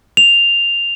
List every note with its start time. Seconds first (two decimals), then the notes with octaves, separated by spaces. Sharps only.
0.17 F7